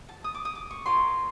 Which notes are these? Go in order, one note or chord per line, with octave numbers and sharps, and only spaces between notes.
A5
D#6
D6
D#6
D6
C#6
F4 A#4 C#5 C6